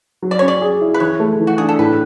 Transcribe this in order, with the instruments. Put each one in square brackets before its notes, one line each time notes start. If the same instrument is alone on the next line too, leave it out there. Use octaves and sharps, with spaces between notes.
[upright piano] F#3
[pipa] D5
[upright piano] C#4 [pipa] C#5
[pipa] D5
[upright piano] G#4
E4
[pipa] B4
[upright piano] E3 [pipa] C#5
[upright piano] A3
E3
[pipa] F#4
[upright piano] D4 [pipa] G#4
[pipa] A4
[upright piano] A2 [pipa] B4